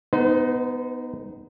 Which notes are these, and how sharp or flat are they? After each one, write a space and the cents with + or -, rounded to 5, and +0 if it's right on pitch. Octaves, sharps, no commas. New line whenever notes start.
B3 +0 D#4 +0 C5 -40